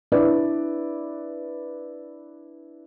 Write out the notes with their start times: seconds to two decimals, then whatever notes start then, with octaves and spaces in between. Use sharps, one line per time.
0.12 D4 E4 B4 D5